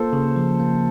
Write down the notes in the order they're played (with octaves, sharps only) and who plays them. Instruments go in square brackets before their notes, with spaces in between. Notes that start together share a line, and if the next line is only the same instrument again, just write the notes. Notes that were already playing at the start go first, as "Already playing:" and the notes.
Already playing: [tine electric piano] A#3 F4 [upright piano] A4 C5
[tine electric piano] C#3
F3
A#3